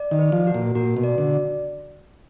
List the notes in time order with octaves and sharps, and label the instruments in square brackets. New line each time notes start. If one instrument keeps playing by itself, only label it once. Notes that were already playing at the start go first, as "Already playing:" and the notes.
Already playing: [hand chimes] D5
[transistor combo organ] D#3
[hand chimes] B4
[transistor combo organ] F3
[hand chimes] F#4
[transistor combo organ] A#2
[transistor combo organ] A#2 [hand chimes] F#4
[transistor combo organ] B2
[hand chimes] D5
[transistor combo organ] D3